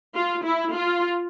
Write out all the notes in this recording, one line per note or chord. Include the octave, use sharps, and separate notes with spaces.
F4
E4
F4